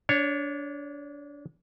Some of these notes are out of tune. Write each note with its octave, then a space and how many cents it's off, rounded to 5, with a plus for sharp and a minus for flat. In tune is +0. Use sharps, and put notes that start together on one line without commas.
D4 -25 C#5 +0